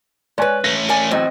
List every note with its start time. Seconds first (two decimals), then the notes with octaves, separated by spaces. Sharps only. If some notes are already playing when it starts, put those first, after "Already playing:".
0.38 G#3 B4 C#5 D5 G#5
0.64 A3 C#4 A#6
0.89 A#4 D5 G#5
1.11 E2 A2 F#3 C4 D#5 G5